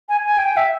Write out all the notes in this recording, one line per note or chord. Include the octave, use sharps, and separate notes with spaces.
G#5
G#5
G5
E5